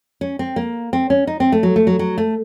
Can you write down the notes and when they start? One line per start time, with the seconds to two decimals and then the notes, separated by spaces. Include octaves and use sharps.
0.21 C#4
0.39 C4
0.56 A#3
0.93 C4
1.10 C#4
1.27 D#4
1.40 C4
1.52 A3
1.63 F#3
1.76 A3
1.87 F#3
1.99 F#3
2.18 A3